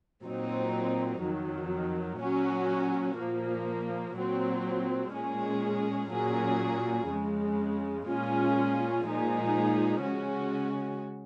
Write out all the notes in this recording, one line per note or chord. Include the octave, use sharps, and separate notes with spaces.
A#2 F#3 C4 D#4
F2 D#3 F#3
A#2 F#3 C#4 F#4
A#2 F3 A#3
A#2 F#3 C4
A#2 G#3 C#4 G#4
A#2 F#3 A#3 C#4 G#4
F2 C#3 G#3
A#2 G#3 C#4 F4 G#4
A#2 F3 G#3 D#4 G#4
C#3 G#3 C#4 F#4